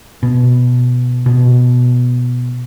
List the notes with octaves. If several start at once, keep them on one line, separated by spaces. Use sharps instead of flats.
B2
B2